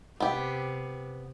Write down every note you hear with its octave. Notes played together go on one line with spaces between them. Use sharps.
C3 B3 G4